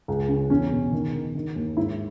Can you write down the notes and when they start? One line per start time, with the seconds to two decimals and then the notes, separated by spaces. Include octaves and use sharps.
0.08 C#2
0.28 C#3
0.50 E2 C#4
0.72 B2
0.92 D#3
1.13 D#3
1.35 D#3
1.56 D#2
1.77 G#2 E4